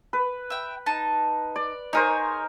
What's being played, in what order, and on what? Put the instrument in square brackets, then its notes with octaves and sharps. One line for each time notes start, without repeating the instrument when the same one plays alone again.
[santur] B4
[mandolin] E5 G5
D#4 A5
[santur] D5
[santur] D#4 A#4 C5 [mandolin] G#4 C#5